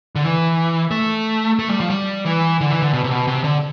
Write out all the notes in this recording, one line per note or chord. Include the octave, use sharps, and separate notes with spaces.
D3
E3
A3
A3
G3
F3
G3
E3
D3
E3
D3
B2
C3
B2
C3
D3